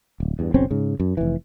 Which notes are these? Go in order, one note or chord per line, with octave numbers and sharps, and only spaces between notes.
D1
E2 G2
F#1 B1 C4 C#4
G#2 C#3
F#2
F1 E3